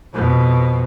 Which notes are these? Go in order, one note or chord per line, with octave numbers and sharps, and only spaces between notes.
F2 B2